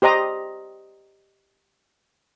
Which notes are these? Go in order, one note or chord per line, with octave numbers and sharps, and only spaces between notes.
G4 C5 D#5 A#5 D#6